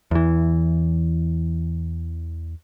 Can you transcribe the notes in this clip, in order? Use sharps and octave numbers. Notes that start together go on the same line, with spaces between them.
E2 E3